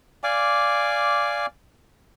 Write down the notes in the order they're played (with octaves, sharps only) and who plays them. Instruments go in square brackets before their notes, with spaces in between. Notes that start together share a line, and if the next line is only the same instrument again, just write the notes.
[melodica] D5 F5 G#5 D6